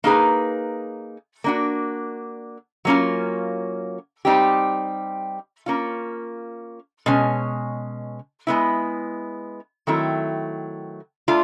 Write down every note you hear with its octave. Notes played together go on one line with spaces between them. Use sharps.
A#3 D#4 G#4 B4
A#3 D4 F#4
F#3 A#3 C#4 F4
G3 C4 D#4 G4
A#3 C#4 F4
B2 G#3 C#4
G#3 B3 E4
D#3 F#3 A3 C4 E4
A3 D4 F4